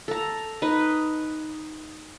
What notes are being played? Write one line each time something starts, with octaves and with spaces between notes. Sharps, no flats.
A4 A#5
D#4 B4